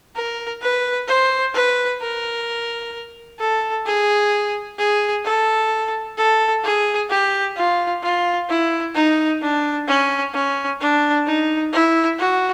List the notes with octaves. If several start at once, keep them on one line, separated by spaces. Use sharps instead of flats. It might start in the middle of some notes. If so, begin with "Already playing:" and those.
A#4
B4
C5
B4
A#4
A4
G#4
G#4
A4
A4
G#4
G4
F4
F4
E4
D#4
D4
C#4
C#4
D4
D#4
E4
F#4